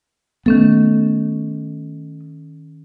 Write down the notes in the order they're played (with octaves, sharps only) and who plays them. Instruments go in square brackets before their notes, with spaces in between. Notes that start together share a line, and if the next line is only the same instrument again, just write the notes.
[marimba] D#3 C#4 A4 [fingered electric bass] A3 B3